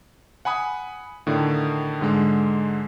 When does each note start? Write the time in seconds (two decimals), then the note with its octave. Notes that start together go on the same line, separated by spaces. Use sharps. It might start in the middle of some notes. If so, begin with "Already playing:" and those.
0.45 F#5 G#5 B5 D#6
1.27 A2 D3 D#3
2.01 G#2 D3 G#3